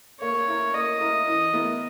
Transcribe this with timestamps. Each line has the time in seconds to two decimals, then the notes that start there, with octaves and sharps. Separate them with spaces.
0.21 A#3 C#5
0.48 E4 A#4
0.74 A#3 D#5
1.01 E4 A#4
1.27 E3
1.53 B3 E4 A#4